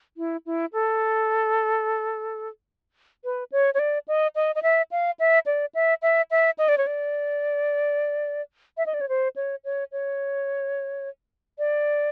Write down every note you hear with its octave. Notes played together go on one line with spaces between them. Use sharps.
E4
E4
A4
B4
C#5
C#5
D5
D#5
D#5
D#5
E5
F5
E5
D5
E5
E5
E5
D#5
D5
C#5
D5
E5
D#5
D5
C#5
C5
C#5
C#5
C#5
D5